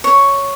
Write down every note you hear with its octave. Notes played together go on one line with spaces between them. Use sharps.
C#5